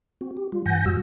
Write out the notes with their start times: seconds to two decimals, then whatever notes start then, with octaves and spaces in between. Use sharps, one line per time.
0.21 C4 F#4
0.37 G4
0.52 G3 F4
0.66 G2 E3 F#5 G#5 G6 A#6
0.86 F#2 A#2 G3 F#4 E6